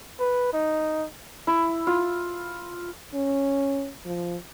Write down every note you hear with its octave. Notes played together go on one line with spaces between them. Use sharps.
B4
D#4
E4
F4
C#4
F3